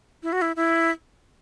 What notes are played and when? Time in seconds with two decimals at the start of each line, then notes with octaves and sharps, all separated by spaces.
0.23 E4
0.33 F#4
0.42 E4
0.56 E4